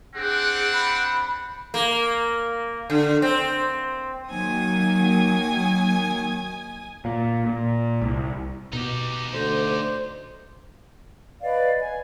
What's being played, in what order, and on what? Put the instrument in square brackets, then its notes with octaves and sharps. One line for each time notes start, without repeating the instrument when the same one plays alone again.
[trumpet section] C4 D4 F#5 [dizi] G#4
[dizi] B5
[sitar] A#3
D3
C4
[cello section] D#3 F#3 A#3 [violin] G#5 D#6
[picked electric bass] A#2
A#2
C2
[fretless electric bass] B2 [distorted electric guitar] D#4 G4
[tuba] D2 [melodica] C5
[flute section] B4 D5 D#5 F5
G#5